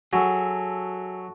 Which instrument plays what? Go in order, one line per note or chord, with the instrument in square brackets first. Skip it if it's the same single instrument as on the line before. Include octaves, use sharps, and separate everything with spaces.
[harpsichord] F#3 [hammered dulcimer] F#4 A4 E5 [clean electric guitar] G#4